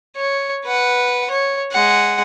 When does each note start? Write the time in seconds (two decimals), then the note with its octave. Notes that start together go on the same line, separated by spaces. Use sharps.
0.17 C#5
0.65 B4 F#5
1.31 C#5
1.72 G#3 F#5